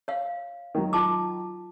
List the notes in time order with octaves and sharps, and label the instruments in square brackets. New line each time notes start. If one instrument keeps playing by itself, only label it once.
[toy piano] C#5 F5
[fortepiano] D#3 F#3
[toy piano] F4 A5 D6